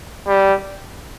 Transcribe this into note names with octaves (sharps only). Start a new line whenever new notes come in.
G3